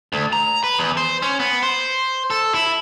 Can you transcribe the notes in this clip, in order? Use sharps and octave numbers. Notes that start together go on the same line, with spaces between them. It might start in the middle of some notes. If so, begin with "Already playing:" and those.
D2
A#5
B4
E2
C5
C#4
B3
C5
A4
E4